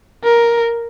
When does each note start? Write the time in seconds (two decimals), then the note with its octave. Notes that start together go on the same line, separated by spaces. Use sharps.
0.24 A#4